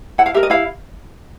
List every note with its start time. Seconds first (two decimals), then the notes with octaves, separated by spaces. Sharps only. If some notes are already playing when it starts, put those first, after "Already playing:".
0.18 E4 F#5
0.26 F5
0.34 G4 A#4 E5
0.43 D#5
0.50 E4 F5